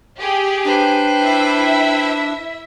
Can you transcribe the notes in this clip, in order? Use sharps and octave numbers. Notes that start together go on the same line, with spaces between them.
G4 G#4
D4 B4 C5 G5
E4 E5